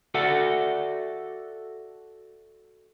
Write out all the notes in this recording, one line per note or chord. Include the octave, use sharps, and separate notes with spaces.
F#4 A4 D5 E5 F#5